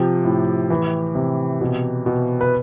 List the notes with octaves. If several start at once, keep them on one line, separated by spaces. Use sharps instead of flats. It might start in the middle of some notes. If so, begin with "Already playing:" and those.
Already playing: C3 F3 G4
A2
E3
C3
B2
B2
B4